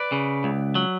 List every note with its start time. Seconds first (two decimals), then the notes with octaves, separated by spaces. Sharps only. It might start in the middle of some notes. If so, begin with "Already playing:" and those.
Already playing: B4 D5
0.12 C#3
0.44 C#2
0.75 F#3